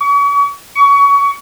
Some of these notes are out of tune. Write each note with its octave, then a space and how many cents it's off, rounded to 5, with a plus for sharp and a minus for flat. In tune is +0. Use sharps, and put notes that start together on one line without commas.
C#6 +40
C#6 +25